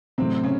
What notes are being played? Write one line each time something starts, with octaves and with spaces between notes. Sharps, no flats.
A2 C3 F#3 A3 C4
C#3 C#4